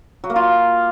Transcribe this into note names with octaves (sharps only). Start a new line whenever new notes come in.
F#3
A#3
F4